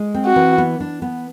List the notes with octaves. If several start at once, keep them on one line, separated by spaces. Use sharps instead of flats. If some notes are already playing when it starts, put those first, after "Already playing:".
Already playing: G#3
C4
F#4
E3
B3
D4
B3